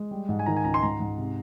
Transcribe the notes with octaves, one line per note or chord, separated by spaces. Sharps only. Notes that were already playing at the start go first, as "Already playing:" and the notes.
Already playing: G#3
G3
G#2
G#5
D#3 A#5
G#5
C#2 A#5
C6
G#2 A#5
G#2
C3